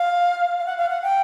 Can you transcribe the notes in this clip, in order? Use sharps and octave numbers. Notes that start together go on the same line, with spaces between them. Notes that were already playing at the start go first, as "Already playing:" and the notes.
Already playing: F5
F5
F#5
F5
F#5
G5